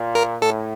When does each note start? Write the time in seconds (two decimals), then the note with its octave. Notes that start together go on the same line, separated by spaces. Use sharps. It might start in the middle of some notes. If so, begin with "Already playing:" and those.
Already playing: A#2
0.15 A#4
0.41 A2 A4